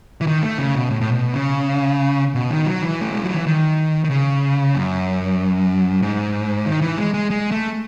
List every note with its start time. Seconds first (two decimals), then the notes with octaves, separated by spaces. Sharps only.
0.21 E3
0.27 D#3
0.43 A3
0.58 C#3
0.74 B2
0.91 A2
1.01 A2
1.12 B2
1.34 C#3
2.35 B2
2.51 D#3
2.66 F#3
2.82 E3
3.01 A3
3.12 G#3
3.24 F#3
3.35 E3
3.47 D#3
4.04 D#3
4.10 C#3
4.75 F#2
6.02 G#2
6.66 D#3
6.81 E3
6.98 G#3
7.14 G#3
7.31 G#3
7.51 A3